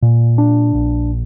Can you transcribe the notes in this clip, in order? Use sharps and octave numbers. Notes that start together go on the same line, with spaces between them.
A#2
D4
A#1